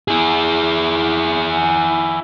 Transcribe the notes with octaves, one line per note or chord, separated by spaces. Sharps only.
E4 G#4